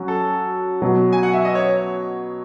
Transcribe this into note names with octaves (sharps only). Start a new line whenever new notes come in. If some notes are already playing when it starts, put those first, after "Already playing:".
Already playing: F#3 C#4 F#4
A4
B2 F#3 B3
G#5
F#5
E5
D#5
C#5